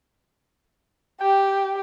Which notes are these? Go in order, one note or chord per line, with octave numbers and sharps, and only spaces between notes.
G4 G5